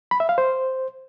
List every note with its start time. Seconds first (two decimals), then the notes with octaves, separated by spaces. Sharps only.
0.11 B5
0.20 E5
0.29 F5
0.38 C5